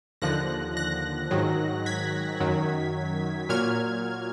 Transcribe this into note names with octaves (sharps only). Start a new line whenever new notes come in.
D#2 D3 F3 F#6 A#6
F#6 A#6
G#2 D#3 F#3
G#6 B6
F#2 D#3 F#3
A#2 F#3 F6 G#6